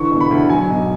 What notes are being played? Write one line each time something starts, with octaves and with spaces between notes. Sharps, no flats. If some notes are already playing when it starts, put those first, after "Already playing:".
Already playing: D3 E3 C#6
E1
B5
D2
F#3 G#5
B1